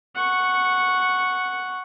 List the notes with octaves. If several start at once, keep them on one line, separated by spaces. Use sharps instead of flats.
F#5 C#6